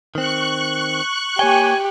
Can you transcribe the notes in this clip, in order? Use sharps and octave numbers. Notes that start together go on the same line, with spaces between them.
D#3 C4 C#6 F#6
A#3 G4 C#5 G5 G#5